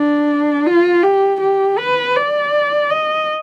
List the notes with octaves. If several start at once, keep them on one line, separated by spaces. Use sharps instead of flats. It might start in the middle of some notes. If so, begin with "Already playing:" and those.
Already playing: D4
F4
G4
G4
B4
D5
D#5